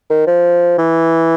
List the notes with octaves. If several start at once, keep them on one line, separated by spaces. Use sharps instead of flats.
D#3
F3
E3